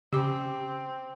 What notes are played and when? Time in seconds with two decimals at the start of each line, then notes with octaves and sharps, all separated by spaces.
0.13 C#3 C4 G4 D6